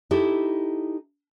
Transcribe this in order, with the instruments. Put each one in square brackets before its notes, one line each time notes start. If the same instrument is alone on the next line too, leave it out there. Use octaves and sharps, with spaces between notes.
[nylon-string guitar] D#4 E4 G4 A4